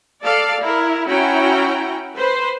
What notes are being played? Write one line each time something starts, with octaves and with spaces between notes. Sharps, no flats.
A4 D5 F5
E4 A#4
C#4 E4 F#4 G5 A#5
B4 C5